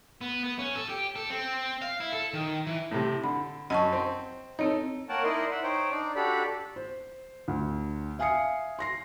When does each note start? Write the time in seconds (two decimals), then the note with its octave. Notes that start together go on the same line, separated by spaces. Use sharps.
0.21 B3
0.44 B3
0.59 C#4
0.76 A4
0.89 G4
1.16 A4
1.30 C4
1.82 F5
2.00 E4
2.12 A4
2.34 D#3
2.67 E3
2.91 A2 C3
3.24 D3 B5
3.70 F#2 D#5 A5 C#6
3.92 C4
4.59 C4 D#4 A4 C#5
5.09 A#3 A#4 C#5 F#5 G5 A5
5.24 D#4 E4 A#4 D5 D#5 C6
5.51 E5 F#5
5.63 D#4 C5 C#5 G5
5.91 D4 D#4 D5
6.16 D4 F#4 G4 A4 D5 B5
6.76 C5
7.48 D2
8.19 E5 F5 G#5 D#6 C7 C#7
8.79 C6 A#6 C7